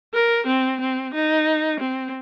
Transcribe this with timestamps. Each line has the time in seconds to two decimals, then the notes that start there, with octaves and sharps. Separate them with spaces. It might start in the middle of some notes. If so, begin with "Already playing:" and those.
0.14 A#4
0.47 C4
0.81 C4
1.14 D#4
1.80 C4